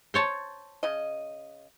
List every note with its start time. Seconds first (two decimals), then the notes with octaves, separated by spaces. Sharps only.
0.14 C5 C#5 A5
0.83 C#3 D#5